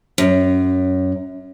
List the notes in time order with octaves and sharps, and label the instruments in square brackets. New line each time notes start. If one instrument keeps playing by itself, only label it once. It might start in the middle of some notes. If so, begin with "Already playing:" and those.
[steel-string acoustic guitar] F#2